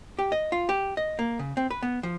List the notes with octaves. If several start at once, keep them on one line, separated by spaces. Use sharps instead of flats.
G4
D#5
F4
G4
D#5
A#3
C#3
C4
B4
B3
F3